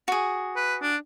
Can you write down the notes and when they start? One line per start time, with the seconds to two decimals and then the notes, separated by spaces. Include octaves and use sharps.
0.08 F#4 G#4
0.56 B4
0.81 D4